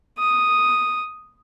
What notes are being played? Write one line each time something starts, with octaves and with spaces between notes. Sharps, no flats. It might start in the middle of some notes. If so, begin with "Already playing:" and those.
D#6